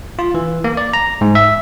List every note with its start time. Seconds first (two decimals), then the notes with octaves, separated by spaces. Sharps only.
0.19 F4
0.34 E3
0.64 A#3
0.77 D5
0.93 A#5
1.21 G#2
1.35 E5